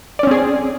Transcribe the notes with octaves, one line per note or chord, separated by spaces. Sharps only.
C4 C#4 G#4 D5